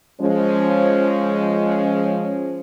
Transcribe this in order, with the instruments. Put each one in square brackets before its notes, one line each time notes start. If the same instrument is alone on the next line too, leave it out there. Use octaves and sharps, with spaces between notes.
[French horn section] F3 G#3 C#4